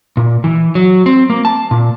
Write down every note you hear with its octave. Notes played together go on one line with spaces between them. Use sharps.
A#2
E3
F#3
C4
A#3
A5
A#2